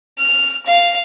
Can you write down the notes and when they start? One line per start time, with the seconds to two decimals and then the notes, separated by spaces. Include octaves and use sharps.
0.18 F6
0.66 F5